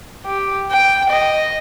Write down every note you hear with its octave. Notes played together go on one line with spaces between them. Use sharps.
G4
G5
D#5